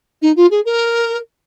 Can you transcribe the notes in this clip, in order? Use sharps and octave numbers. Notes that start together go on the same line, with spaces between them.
D#4
F4
G#4
A#4